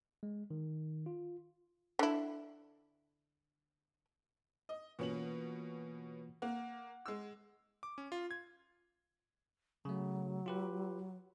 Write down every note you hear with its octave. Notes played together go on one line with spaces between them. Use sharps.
G#3
D#3
F4
D3 E4
D#5
B2 E3 A#3 C#4 F4 F#7
A#3 F#5
G#3 E6
D6
C#4
F4
G#6
C#3 F#3 A3
F4 G4 B4